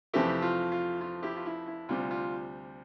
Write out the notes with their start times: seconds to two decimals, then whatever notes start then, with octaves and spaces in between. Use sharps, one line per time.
0.14 F2 C3 E3 A3 C4 E4 G4
0.42 F4
0.72 F4
1.01 F4
1.23 E4 G4
1.36 F4
1.46 E4
1.66 E4
1.89 D2 C3 G3 C4 F4
2.11 F4